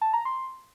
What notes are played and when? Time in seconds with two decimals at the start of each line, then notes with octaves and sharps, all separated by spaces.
0.02 A5
0.13 A#5
0.25 C6